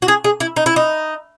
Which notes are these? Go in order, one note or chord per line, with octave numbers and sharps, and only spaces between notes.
F#4
G#4
G#4
E4
D#4
E4
D#4